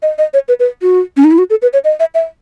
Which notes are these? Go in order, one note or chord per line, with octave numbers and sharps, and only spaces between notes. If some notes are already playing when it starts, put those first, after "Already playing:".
D#5
D#5
C#5
B4
B4
F#4
C#4
D#4
E4
F#4
A4
B4
C#5
D#5
E5
E5